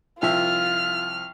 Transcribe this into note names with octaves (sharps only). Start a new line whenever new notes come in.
C2 F3 F4 E5 F6